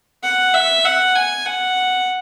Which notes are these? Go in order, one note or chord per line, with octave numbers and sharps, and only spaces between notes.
F#5
E5
F#5
G#5
F#5